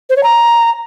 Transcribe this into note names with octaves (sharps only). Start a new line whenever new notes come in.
C5
C#5
A#5